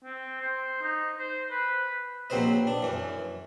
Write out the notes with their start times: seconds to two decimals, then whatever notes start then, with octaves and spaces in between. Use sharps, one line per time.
0.05 C4
0.41 C5
0.83 D#4
1.19 C5
1.51 B4
2.30 A#1 F#3 C4 B4 C5 D#5
2.67 D4
2.82 F#2 E3